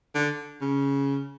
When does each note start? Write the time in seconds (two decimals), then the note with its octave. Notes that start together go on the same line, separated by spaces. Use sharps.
0.15 D3
0.61 C#3